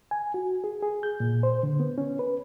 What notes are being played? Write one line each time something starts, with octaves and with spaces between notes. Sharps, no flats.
G#5
F#4
G#4
G#4
G6
A#2
C5
D3
B3
C#4
B4